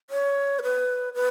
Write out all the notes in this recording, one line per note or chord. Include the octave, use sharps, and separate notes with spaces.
C#5
A#4
B4
B4